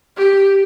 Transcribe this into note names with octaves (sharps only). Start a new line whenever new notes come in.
G4